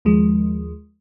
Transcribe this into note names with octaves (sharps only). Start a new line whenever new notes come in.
D#2 F3 G#3